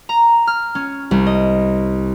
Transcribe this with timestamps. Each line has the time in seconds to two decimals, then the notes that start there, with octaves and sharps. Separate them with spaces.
0.09 A#5
0.47 F6
0.75 C#4
1.11 C2
1.26 D#5